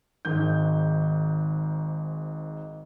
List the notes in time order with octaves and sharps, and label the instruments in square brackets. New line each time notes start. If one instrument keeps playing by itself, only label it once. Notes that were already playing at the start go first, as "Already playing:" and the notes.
[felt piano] G#1 G#2 D#3 G6